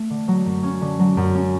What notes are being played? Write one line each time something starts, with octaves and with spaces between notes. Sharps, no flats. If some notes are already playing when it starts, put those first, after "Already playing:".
Already playing: A3
D3
F#3
F#2
C#4
D3
F#3
F#2
C#4